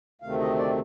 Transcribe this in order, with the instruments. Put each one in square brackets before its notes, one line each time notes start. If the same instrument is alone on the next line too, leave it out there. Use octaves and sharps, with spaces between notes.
[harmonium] D2 C3 D#3 A3 C4 F5
D#5
D5